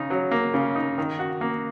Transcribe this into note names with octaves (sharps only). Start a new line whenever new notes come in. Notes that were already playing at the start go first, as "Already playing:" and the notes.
Already playing: C#3 D#4
F#3
A#3
C#3
D#4
D#3
F#4
A#3